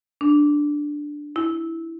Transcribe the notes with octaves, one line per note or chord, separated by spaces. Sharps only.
D4
E4